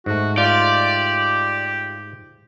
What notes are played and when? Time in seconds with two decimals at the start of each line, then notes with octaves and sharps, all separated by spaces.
0.06 G#2 A3 F#4
0.38 F4 G4 D5